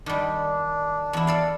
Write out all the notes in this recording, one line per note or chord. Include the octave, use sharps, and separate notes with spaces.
D#3 G3 D4
E2 E4
A4 D5 F5